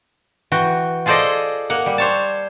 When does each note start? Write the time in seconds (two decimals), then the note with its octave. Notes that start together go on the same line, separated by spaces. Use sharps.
0.52 E3 F#4 G5
1.06 F4 G#4 A4 C5 D5 D#5
1.70 A#3 F#5
1.86 G3
1.98 C5 C#5 A5